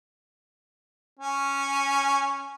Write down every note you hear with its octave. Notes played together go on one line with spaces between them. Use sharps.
C#4